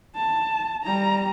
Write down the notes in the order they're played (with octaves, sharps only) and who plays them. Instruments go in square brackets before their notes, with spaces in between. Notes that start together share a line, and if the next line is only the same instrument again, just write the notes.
[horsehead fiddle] A5
G3 A#5